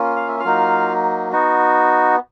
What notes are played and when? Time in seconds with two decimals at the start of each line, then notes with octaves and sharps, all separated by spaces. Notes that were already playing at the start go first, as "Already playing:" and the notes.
Already playing: A#3 C#4 F4
0.16 F5
0.28 E5
0.40 F4 F5
0.45 F#3 A#3 D#4
1.32 B3 D#4 F#4